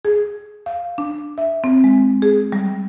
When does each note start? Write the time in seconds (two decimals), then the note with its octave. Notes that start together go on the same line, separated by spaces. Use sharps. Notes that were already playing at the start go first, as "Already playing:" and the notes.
0.05 G#4
0.66 F5
0.98 D4
1.38 E5
1.64 C4
1.84 G#3
2.22 G#4
2.52 G3